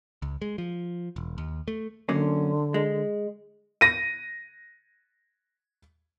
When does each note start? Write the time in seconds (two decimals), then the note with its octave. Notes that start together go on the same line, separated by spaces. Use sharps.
0.22 C#2
0.42 G#3
0.58 F3
1.16 E1
1.38 D#2
1.68 A3
2.09 F#2 D3 A#3 C#4
2.74 G#3
3.81 A#6 D#7